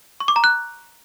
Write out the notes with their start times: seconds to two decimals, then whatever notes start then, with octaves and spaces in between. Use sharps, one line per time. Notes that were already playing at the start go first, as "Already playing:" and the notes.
0.20 C#6
0.28 D6
0.36 A#5
0.44 F#6